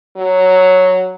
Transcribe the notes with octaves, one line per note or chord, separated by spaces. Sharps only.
F#3